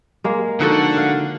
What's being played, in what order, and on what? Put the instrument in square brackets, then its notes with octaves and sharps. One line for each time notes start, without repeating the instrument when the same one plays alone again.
[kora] G#3 A#3
[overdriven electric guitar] D3 [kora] F3 [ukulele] D#4 F#4 A4 [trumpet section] F#5
[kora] F5